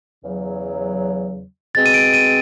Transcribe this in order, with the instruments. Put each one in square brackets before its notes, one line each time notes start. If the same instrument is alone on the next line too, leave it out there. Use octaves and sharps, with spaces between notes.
[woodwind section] E2 C#3 F#3
[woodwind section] B2 G#3 C4 [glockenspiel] A6
[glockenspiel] D#7
D7
D#7